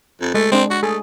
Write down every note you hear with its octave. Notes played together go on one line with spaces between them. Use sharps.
F2
G#3 A3
G#3 C4 D4
F#4
A3 G#4